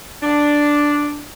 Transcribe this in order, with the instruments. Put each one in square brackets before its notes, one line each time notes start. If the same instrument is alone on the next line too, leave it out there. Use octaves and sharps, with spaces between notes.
[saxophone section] D4